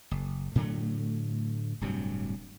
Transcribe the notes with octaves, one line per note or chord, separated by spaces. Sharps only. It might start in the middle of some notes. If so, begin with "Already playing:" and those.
F#1
A2 D3 F#3 A3
D1 G2 C3 F#3